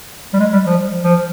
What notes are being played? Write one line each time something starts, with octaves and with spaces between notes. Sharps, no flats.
G3
G#3
G3
F3
F3